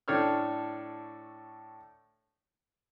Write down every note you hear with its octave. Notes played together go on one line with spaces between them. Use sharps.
A2 D4 A4 C#5 F6